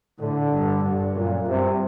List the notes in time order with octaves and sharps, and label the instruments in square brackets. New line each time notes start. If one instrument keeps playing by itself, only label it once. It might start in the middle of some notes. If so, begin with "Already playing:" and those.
[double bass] A2 [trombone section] D3
[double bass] G2
G2
[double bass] F#2 [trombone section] A#2
[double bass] G2 [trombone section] C3